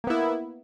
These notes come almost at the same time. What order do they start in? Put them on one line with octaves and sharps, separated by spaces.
A#3 B3 E4